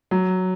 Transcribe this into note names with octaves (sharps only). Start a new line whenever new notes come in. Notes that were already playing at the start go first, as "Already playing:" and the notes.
F#3